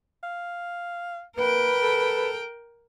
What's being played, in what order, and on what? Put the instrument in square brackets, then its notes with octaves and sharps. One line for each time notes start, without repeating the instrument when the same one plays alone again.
[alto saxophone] F5
[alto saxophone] A#3 [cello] A#4 G5 [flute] B4
[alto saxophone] A4